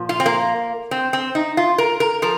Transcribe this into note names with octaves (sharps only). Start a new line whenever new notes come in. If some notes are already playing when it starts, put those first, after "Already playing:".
Already playing: A#2 F3
F4
C4
A#3
C4
C4
D#4
F4
A#4
A#4
F3 A#4